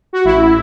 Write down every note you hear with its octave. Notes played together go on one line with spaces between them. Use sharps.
F#4
A1 E4